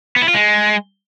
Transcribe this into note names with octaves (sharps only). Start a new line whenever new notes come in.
B3
E4
F4
G#3